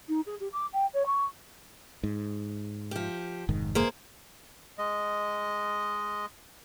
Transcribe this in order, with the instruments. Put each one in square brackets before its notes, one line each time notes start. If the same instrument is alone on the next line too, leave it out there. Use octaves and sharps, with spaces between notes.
[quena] D#4
G#4
G4
D6
G5
C#5
C#6
[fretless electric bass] G#2
[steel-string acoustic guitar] F3 G4
[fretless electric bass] F1 G#2 D#3
[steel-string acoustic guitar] A#3 G#4 C5
[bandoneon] G#3 D#5